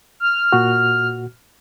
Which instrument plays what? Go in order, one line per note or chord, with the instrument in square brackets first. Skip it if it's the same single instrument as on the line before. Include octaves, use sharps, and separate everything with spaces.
[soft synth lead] F6
[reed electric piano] A#2 F#4